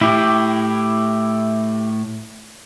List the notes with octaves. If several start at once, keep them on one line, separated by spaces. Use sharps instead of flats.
A2 E4 G4